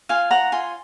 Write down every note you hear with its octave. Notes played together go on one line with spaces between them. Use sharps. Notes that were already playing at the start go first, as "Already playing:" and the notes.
F4 F5 G#5
C#5 F#5 A#5
F4 G#5 C6